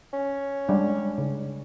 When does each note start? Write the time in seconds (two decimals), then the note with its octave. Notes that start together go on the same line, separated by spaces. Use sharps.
0.13 C#4
0.69 G3 G#3 D4
1.18 C#3